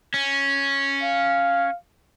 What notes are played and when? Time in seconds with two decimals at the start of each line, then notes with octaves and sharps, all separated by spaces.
0.14 C#4
1.03 F5